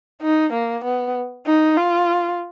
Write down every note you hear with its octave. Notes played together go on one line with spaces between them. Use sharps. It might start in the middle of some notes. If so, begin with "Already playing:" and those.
D#4
A#3
B3
D#4
F4